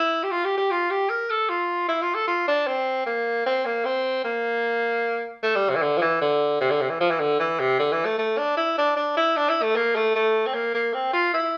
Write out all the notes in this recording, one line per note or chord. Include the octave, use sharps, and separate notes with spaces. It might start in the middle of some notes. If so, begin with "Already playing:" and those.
Already playing: E4
G4
F4
G4
G4
F4
G4
A#4
A4
F4
E4
F4
A4
F4
D4
C4
A#3
C4
A#3
C4
A#3
A3
G3
C3
E3
D3
F3
E3
D3
C3
D3
C3
E3
F3
E3
D3
E3
C3
D3
E3
A3
A3
D4
E4
D4
D4
E4
D4
E4
A3
A#3
A3
A3
C4
A#3
A#3
C4
F4
E4